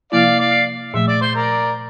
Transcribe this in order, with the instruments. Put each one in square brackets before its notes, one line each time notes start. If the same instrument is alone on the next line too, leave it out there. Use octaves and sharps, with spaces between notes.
[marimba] C3 F3 A#3 E4 [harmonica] D5 F5
[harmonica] D5 F5
[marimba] A#2 F3 A3 [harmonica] E5
[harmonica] D5
C5
A#4 D5